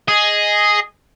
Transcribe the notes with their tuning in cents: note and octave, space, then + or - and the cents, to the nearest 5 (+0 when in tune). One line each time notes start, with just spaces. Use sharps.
G#4 +0 D#5 +0